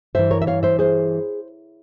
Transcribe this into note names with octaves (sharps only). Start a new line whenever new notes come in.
G2 E3 C5 E5
A#4 C#5
E5
C#5 F5
C5 E5
G#4 C5